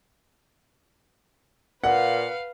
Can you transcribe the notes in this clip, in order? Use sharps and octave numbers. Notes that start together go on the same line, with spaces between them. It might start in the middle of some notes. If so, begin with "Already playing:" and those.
A#2 B4 F5 F#5